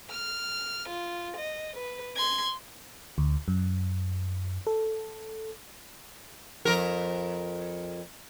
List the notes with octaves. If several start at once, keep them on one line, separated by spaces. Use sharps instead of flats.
F6
F4
D#5
B4
C6 G#6
D2
F#2
A4
F2 A#4